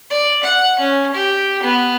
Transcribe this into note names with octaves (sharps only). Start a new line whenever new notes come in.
D5
F#5
C#4
G4
B3